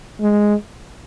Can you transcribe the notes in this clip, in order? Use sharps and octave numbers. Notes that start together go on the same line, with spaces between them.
G#3